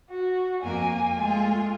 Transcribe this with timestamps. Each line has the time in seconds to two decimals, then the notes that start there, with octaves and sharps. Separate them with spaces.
0.10 F#4
0.63 F2 A#3 G#5
1.17 G#3 A3 F4